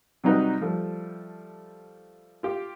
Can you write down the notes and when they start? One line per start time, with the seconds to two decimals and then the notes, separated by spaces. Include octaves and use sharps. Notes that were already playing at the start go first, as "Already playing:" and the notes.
0.24 C3 F#3 G3 D#4 F#4 B4
0.61 F3 G3 A3
2.43 F4 G4